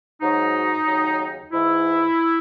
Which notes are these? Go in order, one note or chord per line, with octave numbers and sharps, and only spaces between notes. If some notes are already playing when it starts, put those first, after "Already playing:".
G#2 F#3 D#4
D#2 C#3 F#3
G#2 E3 E4